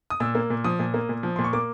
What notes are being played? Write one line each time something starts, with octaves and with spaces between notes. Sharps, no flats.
D#6
A#2 E6
A#3
A#2
F3 D#6
A#2
A#3
A#2
F3
A#2 C6
C#6
A#3 D6